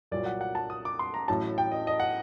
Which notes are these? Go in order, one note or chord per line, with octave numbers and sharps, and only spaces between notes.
C2 A#2 F#3 D5
F#5
F#5
A5
D#6
D6
C6
A#5
A1 A2 F#3 A5
G5
D#5
D#5
F#5